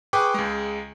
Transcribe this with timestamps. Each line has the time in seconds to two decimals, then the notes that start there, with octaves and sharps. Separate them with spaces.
0.13 G#4 B4 G5 C#6 D6
0.34 C#2 G#3